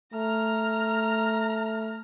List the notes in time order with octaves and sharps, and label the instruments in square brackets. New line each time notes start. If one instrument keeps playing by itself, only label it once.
[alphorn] A3 [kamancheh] A#5 F6